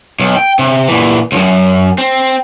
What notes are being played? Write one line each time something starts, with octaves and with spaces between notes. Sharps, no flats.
B1
G5
C3
A#2 E3
C#2 F#2
C4